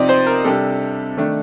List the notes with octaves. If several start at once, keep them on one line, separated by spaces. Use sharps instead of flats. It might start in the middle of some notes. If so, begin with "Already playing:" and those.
Already playing: C3 F3 C4 D#4 D5 D#5
C5
A#4
C3 G3 D4 A4
D#3 A3 D4